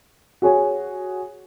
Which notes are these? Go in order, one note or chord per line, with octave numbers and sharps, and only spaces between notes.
F#4 G#4 C#5 G#5